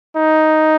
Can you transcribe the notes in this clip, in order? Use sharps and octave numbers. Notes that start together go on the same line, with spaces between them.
D#4